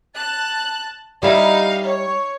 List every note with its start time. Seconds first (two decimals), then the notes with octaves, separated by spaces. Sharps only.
0.17 A5 F#6
1.23 G3 D#4 E4 F5
1.84 C#5